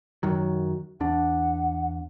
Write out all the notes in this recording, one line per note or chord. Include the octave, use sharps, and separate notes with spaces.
F#2 D#3 F#3
E2 D4 F#5